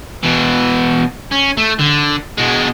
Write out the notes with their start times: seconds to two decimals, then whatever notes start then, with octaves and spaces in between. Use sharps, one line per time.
0.23 B2 E3
1.32 C#4
1.58 A3
1.80 D3
2.38 B2 G#3